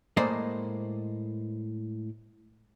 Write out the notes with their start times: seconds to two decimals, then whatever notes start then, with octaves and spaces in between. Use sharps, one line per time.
0.17 A2 G#3 A#3 C5 D5 D#5